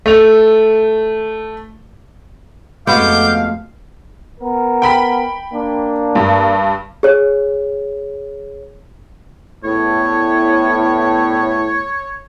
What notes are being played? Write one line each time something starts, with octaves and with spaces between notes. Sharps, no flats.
A3 F7
F2 G#3 A3 B3 F#4 F5 D6 G6
B3 A#4
G5 B5 B6
A#3 D4
G2
G#4 C#5
E2 A2 C#5